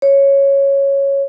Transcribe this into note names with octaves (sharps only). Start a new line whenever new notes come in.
C#5